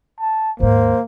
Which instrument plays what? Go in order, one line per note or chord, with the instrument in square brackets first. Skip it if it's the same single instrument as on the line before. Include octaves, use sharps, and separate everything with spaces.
[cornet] A5
[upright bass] D#2 G#2 [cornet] A#3 [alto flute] C5